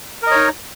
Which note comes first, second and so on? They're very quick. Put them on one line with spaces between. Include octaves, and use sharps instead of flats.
A#4 D#5 C#5 D#4